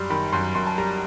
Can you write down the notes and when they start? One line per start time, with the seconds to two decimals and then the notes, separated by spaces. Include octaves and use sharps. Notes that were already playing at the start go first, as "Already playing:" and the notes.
Already playing: F#2 G3 B5 C6
0.10 D#3 B5
0.33 F#2 C6
0.55 F#2 C6
0.67 A5
0.78 G3 A#5